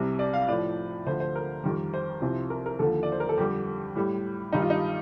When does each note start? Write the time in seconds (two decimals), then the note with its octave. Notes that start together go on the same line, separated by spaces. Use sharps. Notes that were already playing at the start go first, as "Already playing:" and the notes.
Already playing: C2 C3 G3
0.19 D5
0.34 F5
0.48 A2 F3 D5
1.06 D2 D3 F3 C5
1.20 C5
1.35 A#4
1.64 F2 D#3 G3
1.94 C5
2.22 C2 C3 F3
2.50 A#4
2.66 A#4
2.79 D#2 D3 F3 A4
3.03 D5
3.12 C5
3.20 A#4
3.29 A4
3.38 F2 D3 G3 G4
3.95 A2 G3
4.53 G2 D#3 G3 D#4
4.62 F4
4.70 D#4